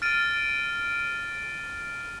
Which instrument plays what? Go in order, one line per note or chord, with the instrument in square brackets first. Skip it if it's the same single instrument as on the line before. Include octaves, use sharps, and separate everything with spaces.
[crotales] F6 A6 D7 D#7